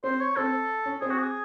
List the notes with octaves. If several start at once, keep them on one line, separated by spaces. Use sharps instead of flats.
C4 C5
C#5
C4 A4
C#4
C4 G#4
F#4
G#4